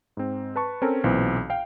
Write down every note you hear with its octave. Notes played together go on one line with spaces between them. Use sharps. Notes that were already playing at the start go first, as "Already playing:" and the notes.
G#2 C4
B4 A5 C#6
C4 C#4 A4 A#4
B1 A#2 E3 C4
F5 G5